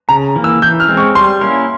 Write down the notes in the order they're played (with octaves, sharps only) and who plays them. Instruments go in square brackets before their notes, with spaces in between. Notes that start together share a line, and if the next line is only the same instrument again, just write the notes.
[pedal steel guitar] C#3 [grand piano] A#5
[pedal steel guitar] E3 A#3
[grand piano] E6
[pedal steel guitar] E3 [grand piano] G6
[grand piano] F6
[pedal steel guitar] G#3 C4
[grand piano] C#6
[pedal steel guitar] G3 [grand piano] C6
[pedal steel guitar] A#3 C#4 E4 A#4